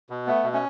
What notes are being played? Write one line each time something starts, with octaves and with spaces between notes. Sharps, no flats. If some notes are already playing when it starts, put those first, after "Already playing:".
B2
A3 B3
B2
A3 C#4